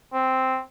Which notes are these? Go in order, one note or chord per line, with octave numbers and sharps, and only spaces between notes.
C4